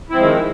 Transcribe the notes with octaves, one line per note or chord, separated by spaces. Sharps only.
D#3 F3 G#3 C4 E4